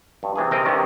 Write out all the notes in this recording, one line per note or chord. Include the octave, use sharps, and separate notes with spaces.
G2
C3 E3 G#4
C3 C4 A#4 D#5
G2 C3 D#3 C#4